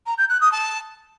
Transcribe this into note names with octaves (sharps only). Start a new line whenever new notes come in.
A#5
G6
F#6
D#6
A5